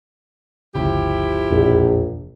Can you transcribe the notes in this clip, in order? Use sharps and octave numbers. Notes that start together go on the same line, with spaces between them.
G1 D2 C#3 F3 E4 G4
E1 A#1 F2